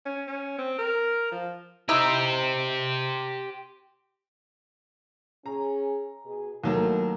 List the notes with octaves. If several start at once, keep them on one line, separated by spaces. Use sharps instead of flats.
C#4
C#4
C4
A#4
F3
D#4 E4 G4 C5
C#4 G#4 A#5
B2 G#4
D#2 F#3 A3 B3 E4 A#4